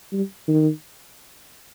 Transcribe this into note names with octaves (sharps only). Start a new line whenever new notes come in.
G3
D#3